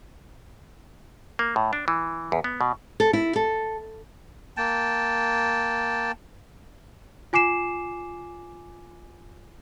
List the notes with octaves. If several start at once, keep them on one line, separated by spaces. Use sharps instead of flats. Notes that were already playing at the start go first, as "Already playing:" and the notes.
A#3
A2
D4
E3
E2
B3
B2
A4
E4
A4
A#3 G5 A5
F4 G#5 D6 C7 E7